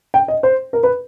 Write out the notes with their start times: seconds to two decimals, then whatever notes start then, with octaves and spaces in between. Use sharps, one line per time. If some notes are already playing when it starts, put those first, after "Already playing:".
0.14 G5
0.28 D#5
0.43 C5
0.73 A#4
0.83 B4